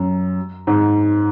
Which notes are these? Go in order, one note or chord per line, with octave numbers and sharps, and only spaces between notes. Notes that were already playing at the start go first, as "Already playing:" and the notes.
Already playing: F#2
G#2